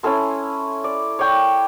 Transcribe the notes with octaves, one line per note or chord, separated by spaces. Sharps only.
C#4 E4 A4 C6
D5
C#5 D5 G5 C#6